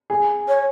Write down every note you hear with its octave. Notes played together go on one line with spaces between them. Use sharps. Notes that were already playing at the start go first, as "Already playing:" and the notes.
G#4
C#5